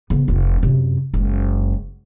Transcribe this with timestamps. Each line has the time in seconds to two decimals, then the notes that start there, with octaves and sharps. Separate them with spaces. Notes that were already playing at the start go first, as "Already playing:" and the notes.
0.10 C#3 B3
0.28 F1 F4
0.63 F#2 C3
1.14 F#1 G#3